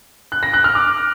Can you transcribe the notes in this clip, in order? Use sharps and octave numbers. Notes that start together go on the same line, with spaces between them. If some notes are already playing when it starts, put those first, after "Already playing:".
F#6
A#6
F#6
F6
D6